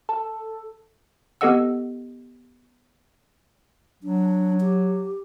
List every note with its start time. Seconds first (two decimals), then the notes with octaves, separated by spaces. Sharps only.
0.09 A4
1.41 B3 G4 A4 D#5 F#5 E6
4.03 F#3 D4
4.60 G4